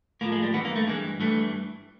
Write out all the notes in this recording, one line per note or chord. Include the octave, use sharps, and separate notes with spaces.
A2 F3 A#3
G#3
G3
G2 E3 B3
A#3
A3
G2 E3 G#3
G2 E3 A3